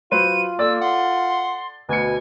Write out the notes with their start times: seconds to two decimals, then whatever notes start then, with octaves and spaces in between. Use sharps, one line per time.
0.11 F#3 F4 B4 C5 D#7
0.59 A#3 A4 D5 E6
0.81 F#5 C6
1.89 D2 B2 G#5 C#7